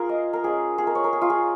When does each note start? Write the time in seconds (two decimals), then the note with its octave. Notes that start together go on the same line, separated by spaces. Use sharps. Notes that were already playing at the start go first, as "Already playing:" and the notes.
Already playing: F4 G#4 A#4
0.09 D#5
0.33 A#4
0.44 G#3 C#4 F4 G#4
0.78 G#4
0.87 A#4
0.95 C#5
1.04 A#4
1.13 G#4
1.22 F4
1.30 G#4